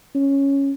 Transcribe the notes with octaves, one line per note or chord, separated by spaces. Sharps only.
C#4